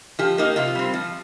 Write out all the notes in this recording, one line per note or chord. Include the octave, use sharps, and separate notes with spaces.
F3 G4
A#3 D#4
C3 F4
G3 C4
F3